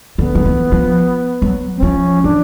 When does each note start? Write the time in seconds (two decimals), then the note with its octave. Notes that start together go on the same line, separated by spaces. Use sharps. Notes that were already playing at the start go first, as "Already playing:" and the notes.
0.18 D3 B3
0.35 F3
0.45 E3
0.72 F3
1.42 F#3
1.77 C4
1.82 F3 C#4
2.23 E3 D4